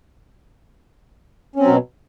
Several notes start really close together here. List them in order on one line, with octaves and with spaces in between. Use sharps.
C#4 C4 F#3 B2